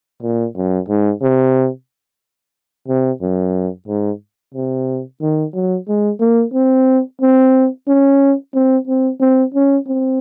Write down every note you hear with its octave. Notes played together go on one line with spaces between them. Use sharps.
A#2
F#2
G#2
C3
C3
F#2
G#2
C3
D#3
F#3
G#3
A#3
C4
C4
C#4
C4
C4
C4
C#4
C4